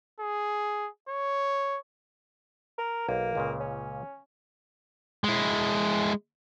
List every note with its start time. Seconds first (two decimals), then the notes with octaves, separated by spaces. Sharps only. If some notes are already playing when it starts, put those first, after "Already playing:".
0.20 G#4
1.09 C#5
2.78 A#4
3.09 B1 A#3
3.35 C#2 A#2 C#3
3.60 C#4
5.24 G#3 E4